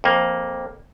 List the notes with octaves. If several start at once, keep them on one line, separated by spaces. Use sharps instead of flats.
F2 A#3